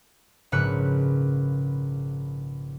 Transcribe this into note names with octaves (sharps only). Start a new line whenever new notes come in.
A#1 G#2 C#3 B4 F#6 C#7